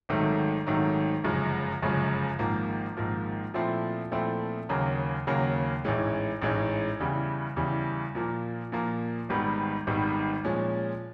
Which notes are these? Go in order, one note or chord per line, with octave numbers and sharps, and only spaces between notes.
G#1 G#2 D#3 F#3 A3
G#1 G#2 D#3 F#3 A3
G1 F#2 C#3 F3 G#3
G1 F#2 C#3 F3 G#3
G#1 G#2 F3 A#3
G#1 G#2 F3 A#3
A#2 F3 A3 C4 E4
A#2 F3 A3 C4 E4
D#2 C#3 F#3 A#3
D#2 C#3 F#3 A#3
A1 G#2 E3 G#3 C#4
A1 G#2 E3 G#3 C#4
E2 C#3 E3 G3
E2 C#3 E3 G3
A#2 F3 A#3
A#2 F3 A#3
G#1 G#2 D#3 G3 B3
G#1 G#2 D#3 G3 B3
A#2 F3 G#3 C#4